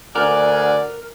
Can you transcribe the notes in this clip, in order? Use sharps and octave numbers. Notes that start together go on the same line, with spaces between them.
D2 A#4 D5 F#5 G#5